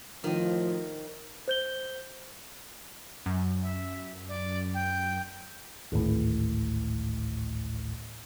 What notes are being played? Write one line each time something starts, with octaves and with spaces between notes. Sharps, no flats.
A2 D#3 F3 D#5
C5 G6 G7
F#2
E5
D5
G5
G#1 D2 A2